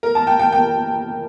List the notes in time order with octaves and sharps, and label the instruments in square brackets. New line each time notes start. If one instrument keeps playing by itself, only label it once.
[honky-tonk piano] A#4
A5
G5
G5
G5